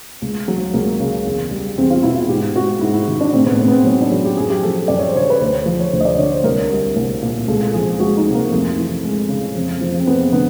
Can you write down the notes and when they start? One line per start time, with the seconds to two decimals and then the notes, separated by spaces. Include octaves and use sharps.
0.22 C#2
0.48 F#3
0.74 C#2 A#3
1.00 C#3
1.26 E2
1.51 G3
1.78 E2 C4
1.90 F4
2.03 B2 E4
2.16 F4
2.29 G#2 G4
2.55 G#3 F#4
2.81 G#2 E4
2.94 E4
3.08 D#3
3.21 D4
3.33 A2 C4
3.46 B3
3.59 A2 C4
3.68 B3
3.71 C4
3.84 F#3 C#4
4.02 D4
4.11 F#3
4.25 G4
4.37 F#2 G#4
4.50 G4
4.62 F3 A4
4.88 F#2 D5
4.99 C#5
5.08 C5
5.15 D3 C#5
5.30 B4
5.41 D2 C5
5.66 F3
5.80 C#5
5.93 D2 C5
6.00 D#5
6.05 D5
6.18 D3 C#5
6.32 C5
6.44 C2 A#4
6.70 G3
6.96 C2
7.22 A#2
7.48 C#2 A4
7.74 F3 G#4
8.00 G#3 F#4
8.17 D#4
8.26 C3
8.34 A#3
8.51 F2 A3
8.78 E3
9.04 G#3
9.29 C#3
9.55 F2
9.81 F3
10.00 C4
10.07 F2 B3
10.33 D3 B3